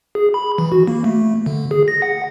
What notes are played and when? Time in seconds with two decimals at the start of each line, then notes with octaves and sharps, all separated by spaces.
0.15 G#4
0.34 B5
0.58 E3
0.72 F#4
0.87 A#3
1.04 A3
1.46 D3
1.71 G#4
1.88 A#6
2.02 F#5